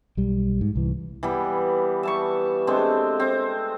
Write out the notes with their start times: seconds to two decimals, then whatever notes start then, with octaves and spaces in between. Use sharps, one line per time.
0.17 B1 G3
0.61 G#2
0.75 C2 E3
1.23 E3 G3 B3
2.03 E5 A5 C#6
2.67 G#3 A3 C4 D4
3.20 C4